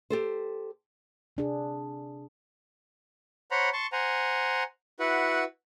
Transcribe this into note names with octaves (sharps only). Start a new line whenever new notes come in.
G4 A4 C5
C3 D4 G#4
C5 C#5 F#5 A#5 B5
A5 C6 C#6
C5 F#5 G#5 A#5
E4 F#4 B4 F#5